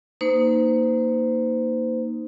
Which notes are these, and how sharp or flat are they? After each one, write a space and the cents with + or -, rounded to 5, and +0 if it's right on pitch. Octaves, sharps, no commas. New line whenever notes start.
A#3 +0 D#4 +0 C5 -30